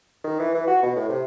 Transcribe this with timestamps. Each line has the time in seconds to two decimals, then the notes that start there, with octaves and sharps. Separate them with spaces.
0.24 D#3
0.39 E3
0.55 E3
0.67 F#4
0.83 B2
0.96 A2
1.09 C3